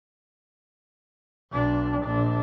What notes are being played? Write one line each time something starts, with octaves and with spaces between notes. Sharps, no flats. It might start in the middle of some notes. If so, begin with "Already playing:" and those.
B1 D4
A#1 D4